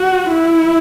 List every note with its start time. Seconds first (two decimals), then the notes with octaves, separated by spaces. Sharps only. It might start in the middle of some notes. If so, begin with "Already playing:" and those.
Already playing: F#4
0.30 E4